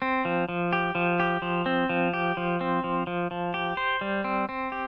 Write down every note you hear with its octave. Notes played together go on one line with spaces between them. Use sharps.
C4
F3
F3
G4
F3
G4
F3
C4
F3
G4
F3
C4
F3
F3
F3
G4
C5
G3
C4
C4
G4